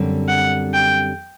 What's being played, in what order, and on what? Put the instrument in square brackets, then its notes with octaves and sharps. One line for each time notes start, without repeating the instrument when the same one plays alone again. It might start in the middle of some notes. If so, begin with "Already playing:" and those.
Already playing: [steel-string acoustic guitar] F#2 D3 G3 C4
[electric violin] F#5
G5